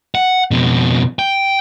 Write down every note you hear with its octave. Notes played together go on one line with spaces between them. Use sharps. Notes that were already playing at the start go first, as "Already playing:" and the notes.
F#5
F2 B2
G5